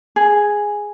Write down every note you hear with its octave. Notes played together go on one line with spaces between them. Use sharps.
G#4